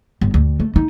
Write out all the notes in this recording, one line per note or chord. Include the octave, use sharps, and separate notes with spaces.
G1
D2
A3
D#4